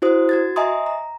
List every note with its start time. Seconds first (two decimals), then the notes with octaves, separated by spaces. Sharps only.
0.02 E4 F#4 C5 D#6
0.29 F#4 G#6 A6
0.56 D#5 E5 G#5 A#5 C6 D#6
0.86 A#5